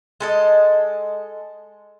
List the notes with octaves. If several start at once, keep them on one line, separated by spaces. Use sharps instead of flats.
G#3 A4 D#5